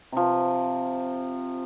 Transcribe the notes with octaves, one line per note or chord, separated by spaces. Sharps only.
C3 F3